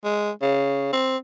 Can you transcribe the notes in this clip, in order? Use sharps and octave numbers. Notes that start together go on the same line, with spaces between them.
G#3
C#3
C4